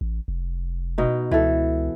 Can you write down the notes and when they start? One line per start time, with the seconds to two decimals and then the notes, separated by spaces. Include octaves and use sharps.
0.01 A1
0.28 F1
0.98 B2 D#4
1.31 C#2 E3 A4